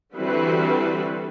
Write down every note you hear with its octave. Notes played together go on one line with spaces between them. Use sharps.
D3 E3 G3 C4 F#4 B4